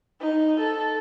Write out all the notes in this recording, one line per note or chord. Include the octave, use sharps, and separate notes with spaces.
D#4
A4